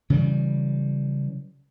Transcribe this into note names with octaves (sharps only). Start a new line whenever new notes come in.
C#3 E3 F#3 G3